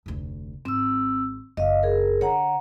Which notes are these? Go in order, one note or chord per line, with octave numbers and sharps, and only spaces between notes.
F1 D2
G#1 C4 E6
F#1 D#5 F5
G#4 A#4
D3 C#5 F#5 A#5